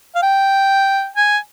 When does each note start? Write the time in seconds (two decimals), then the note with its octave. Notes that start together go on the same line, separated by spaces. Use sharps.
0.15 F5
0.23 G5
1.16 G#5